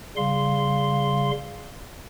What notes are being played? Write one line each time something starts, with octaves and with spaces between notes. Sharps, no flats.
C#3 G3 F5 C6